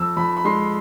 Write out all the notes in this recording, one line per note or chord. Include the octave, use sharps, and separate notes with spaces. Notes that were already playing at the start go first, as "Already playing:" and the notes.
Already playing: F2 E6
F2 B5
B5
G#3 C6